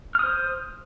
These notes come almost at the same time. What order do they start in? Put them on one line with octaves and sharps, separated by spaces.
F6 D#6 C5